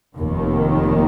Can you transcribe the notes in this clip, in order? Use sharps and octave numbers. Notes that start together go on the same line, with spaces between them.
F1 D#2 D#3